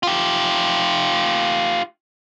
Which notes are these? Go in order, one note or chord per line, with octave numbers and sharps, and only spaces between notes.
F4 G4